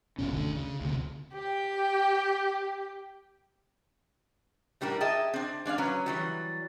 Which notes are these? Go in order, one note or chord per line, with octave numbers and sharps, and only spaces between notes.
F#1 C2 B2 C#4
D2 D3
C#3
D2 C3
G4 G5
A2 G3 D4 A#4
G#4 D#5 E5 G5 A5
C4 D4
G#3 D4 D5 F5
F#3 C#4 B4
E3 F#3 G3